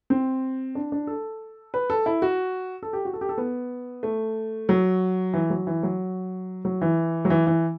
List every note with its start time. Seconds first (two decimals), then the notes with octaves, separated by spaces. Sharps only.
0.10 C4
0.75 D4
0.92 D4
1.07 A4
1.74 B4
1.90 A4
2.06 E4
2.22 F#4
2.83 A4
2.93 G4
3.05 F#4
3.13 A4
3.21 G4
3.29 A4
3.38 B3
4.03 A3
4.69 F#3
5.34 E3
5.50 F#3
5.67 E3
5.83 F#3
6.65 F#3
6.81 E3
7.25 F#3
7.30 E3
7.47 E3